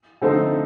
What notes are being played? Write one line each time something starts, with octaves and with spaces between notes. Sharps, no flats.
D3 F3 A3 C4 D#4